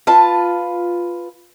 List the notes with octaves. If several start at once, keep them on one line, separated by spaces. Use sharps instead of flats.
F4 B4 A5